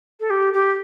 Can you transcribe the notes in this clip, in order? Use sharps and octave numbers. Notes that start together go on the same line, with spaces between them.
A4
G4
G4